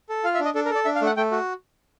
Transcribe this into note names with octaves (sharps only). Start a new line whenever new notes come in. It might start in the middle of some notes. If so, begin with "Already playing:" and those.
A4
F4 F5
E5
D4
D#5
D4 A4
A#4
A4 D5
D4 E5
F5
A3 F#5
A3 G5
F#4